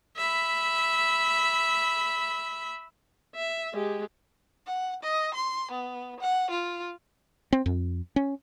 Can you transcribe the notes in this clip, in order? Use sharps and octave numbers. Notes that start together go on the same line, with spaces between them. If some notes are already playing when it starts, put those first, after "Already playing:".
E5 B5
E5
G#3 G4
F#5
D#5
C6
B3
F#5
F4
C4
F2
C#4